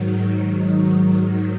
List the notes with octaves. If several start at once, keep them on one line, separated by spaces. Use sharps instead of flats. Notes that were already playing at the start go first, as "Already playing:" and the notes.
Already playing: G#2 D#3 F#3